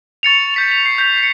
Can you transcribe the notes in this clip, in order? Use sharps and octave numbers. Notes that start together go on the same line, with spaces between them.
C#6 A6 C#7 F7
G6 B6 F7
F7
C7
G6 B6
B6 C#7